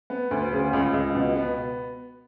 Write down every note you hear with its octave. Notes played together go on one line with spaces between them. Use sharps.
B3
D2
C#3
C#2
C#2
B2
B3